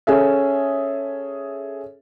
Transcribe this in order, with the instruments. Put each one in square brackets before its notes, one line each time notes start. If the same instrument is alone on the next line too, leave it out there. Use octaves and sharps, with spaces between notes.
[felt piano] C#4 G#4 A4 E5